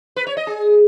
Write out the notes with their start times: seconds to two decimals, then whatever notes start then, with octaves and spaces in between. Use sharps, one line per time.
0.16 B4
0.27 C#5
0.37 D#5
0.47 G#4